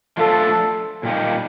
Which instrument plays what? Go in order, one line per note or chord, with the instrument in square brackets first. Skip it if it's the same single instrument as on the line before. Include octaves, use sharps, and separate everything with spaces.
[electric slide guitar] F3 A3 D4 F4 [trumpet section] A4
[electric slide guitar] A#2 G3 A#3 D#4